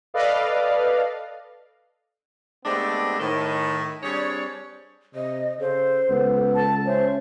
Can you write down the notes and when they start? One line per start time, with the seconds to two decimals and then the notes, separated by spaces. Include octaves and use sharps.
0.14 A4 B4 D5 D#5 F5
2.66 G#3 A3 B3 C4 D4 G4
3.20 A2 D#3
4.03 G3 C4 D4 G#4 C#5
5.15 C3 D#5
5.60 C#3 A4 C5
6.09 C#2 B3
6.55 A5
6.86 C#4 C5 E5